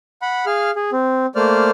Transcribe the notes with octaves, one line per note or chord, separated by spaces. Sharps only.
F#5 B5
G#4 F5 F6
G#4
C4
A3 A#3 C5 D5 F6